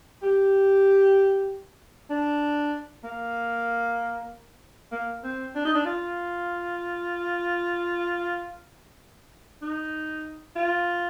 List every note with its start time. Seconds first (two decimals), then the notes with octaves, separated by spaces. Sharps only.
0.22 G4
2.10 D4
3.04 A#3
4.92 A#3
5.23 C4
5.55 D4
5.65 D#4
5.75 D4
5.85 F4
9.62 D#4
10.56 F4